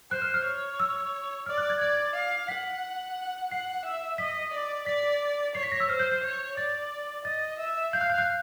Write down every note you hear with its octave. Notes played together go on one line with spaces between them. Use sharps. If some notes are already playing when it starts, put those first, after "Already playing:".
C5 F#6
F6
F6
C#5
E6
D5 F6
F#6
G#6
D5 G#6
F5
F#5 B6
F#5 C7
E5
D#5 B6
D5
D5 B6
C#5 C7
B6
A#6
E6
C5 F6
G6
G6
C#5
D5 A6
D#5 A6
E5
F5 G6
F#6
G6
F#6